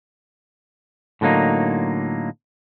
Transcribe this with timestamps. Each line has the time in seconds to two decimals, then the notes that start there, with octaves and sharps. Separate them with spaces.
1.21 A2 D3 F#3 A#3 D#4